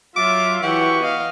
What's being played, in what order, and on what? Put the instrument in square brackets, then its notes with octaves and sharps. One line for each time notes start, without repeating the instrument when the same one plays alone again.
[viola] F#3 E5 [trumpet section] F4 [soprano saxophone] D6
[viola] E3 [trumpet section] F#4 G4 C#6 [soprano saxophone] F#5
[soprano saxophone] B3 [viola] D#5 F5